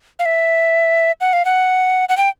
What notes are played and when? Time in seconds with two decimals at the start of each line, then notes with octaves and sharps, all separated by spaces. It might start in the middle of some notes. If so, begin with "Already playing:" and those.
0.19 F5
0.26 E5
1.21 F#5
1.33 F5
1.45 F#5
2.09 F#5
2.17 G5